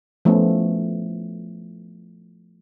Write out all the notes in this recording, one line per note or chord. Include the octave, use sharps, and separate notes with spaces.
F3 A3 B3 C#4